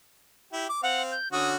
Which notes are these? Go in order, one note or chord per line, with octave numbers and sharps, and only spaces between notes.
E4 G4
D6
C4 F5 F#5
G6
D3 C#4 F#4 D#6